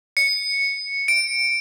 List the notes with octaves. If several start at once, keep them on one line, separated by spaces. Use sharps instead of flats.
C#7
D7